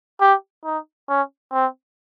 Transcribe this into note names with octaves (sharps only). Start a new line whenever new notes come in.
G4
D#4
C#4
C4